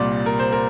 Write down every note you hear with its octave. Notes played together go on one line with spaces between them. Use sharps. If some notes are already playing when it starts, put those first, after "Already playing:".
Already playing: C2 A#2 G3 D5
A#4
C5
A#4